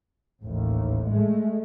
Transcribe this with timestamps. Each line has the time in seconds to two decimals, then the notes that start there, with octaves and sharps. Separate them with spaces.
0.44 A1 D#2
1.11 G#3 A3